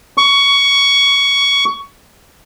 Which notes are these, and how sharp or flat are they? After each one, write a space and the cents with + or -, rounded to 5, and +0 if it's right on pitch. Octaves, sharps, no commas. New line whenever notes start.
C#6 +15